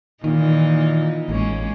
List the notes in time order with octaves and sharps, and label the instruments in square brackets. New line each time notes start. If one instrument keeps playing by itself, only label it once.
[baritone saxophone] A#2 [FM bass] D#3 [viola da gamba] E3 D#4
[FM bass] A1 [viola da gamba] G#3 A#3 C#4